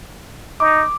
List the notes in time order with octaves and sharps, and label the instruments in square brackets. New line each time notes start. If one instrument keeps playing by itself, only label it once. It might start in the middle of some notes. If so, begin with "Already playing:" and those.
[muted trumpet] D#4 [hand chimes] D6